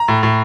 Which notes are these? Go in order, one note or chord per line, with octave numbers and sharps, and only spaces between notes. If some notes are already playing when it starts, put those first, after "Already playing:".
Already playing: A#5
A2
A2